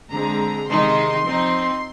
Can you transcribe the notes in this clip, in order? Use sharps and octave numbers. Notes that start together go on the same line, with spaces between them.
D3 G#3 C4 A#5
C3 D#3 G#3 D#4 C6
F3 C4 D#4